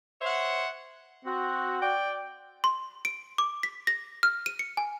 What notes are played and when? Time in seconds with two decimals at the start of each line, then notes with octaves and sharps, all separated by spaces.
0.20 C5 C#5 E5 F#5
1.25 C4 F#4
1.82 D5 G5
2.64 C6
3.05 D7
3.38 D6
3.63 B6
3.87 A#6
4.23 F6
4.46 D#7
4.59 C#7
4.77 G#5